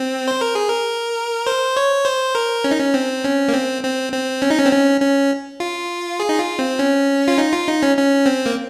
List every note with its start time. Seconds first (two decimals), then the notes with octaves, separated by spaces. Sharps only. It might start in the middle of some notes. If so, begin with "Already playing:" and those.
Already playing: C4
0.28 C5
0.41 A#4
0.55 G#4
0.69 A#4
1.47 C5
1.77 C#5
2.05 C5
2.35 A#4
2.64 C#4
2.71 D#4
2.79 C#4
2.94 C4
3.24 C#4
3.48 A#3
3.53 C4
3.83 C4
4.12 C4
4.42 C#4
4.50 D#4
4.58 C#4
4.66 C4
4.72 C#4
5.01 C#4
5.60 F4
6.20 G#4
6.29 D#4
6.39 F4
6.59 C4
6.79 C#4
7.28 F4
7.38 D#4
7.53 F4
7.68 D#4
7.83 C#4
7.97 C#4
8.26 C4
8.46 A#3